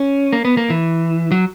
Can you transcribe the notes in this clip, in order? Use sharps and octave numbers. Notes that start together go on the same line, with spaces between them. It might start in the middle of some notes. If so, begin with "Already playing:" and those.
Already playing: C#4
A#3
B3
A#3
E3
F#3